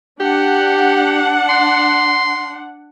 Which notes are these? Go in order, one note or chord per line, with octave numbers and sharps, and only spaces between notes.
D4 G4 F#5
C6